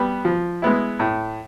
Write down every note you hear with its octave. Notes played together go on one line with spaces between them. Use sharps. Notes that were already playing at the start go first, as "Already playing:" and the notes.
Already playing: G3 B3
F3
G#3 B3 E4
A2